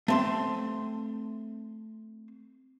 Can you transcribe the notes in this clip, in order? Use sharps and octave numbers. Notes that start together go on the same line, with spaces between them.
A3 C4 C6